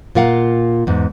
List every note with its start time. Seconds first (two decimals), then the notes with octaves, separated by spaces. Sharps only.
0.15 A#2 F4 A#4 F5 F#5
0.87 E2 G#2